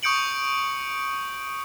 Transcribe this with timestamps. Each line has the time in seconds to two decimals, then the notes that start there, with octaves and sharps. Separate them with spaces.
0.03 C#6 D#6 G6 C#7 D7 F#7